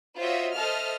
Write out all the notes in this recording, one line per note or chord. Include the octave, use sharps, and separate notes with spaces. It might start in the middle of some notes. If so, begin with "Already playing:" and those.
F4 F#4 C5 C#5 D#5 E5
A4 C5 D#5 E5 A5 F6